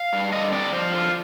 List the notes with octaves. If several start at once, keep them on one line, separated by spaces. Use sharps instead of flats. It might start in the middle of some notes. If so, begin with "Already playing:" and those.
Already playing: F5
G2
D3 D#5
C4 D5
F3 C5
D3 F4